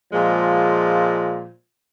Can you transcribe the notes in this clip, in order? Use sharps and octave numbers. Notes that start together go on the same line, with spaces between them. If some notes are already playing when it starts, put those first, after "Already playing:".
A#2 F3 G#3